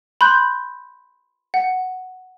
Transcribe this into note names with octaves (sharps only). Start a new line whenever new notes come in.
B5 C6 F#6 G6
F#5